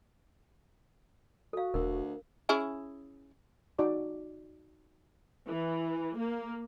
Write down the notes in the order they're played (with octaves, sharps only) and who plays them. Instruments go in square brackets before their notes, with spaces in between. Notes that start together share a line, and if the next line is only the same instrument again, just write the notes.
[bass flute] F#4 [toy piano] A4 F5
[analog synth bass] E1 [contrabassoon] D2 [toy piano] A#4
[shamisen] C#4 E4 G#4
[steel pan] D#4 F#4 D5 D6
[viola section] E3
A#3